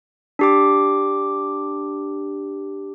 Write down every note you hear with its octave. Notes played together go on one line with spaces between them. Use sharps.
D4 G4 D6